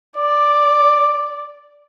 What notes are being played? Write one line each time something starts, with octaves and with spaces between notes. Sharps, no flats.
D5 D6